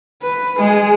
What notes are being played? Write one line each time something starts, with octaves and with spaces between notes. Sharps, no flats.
B4
G#3 G#4